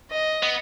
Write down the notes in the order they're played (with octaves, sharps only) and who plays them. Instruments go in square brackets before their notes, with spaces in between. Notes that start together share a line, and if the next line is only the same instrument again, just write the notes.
[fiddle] D#5
[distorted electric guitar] B3